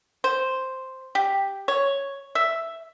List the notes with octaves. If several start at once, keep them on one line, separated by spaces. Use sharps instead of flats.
C5
G4
C#5
E5